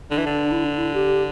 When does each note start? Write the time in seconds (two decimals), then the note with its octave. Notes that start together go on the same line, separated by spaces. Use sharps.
0.11 D3 D4
0.17 E3
0.26 D3
0.52 E4
0.65 D4
0.78 E4
0.94 G4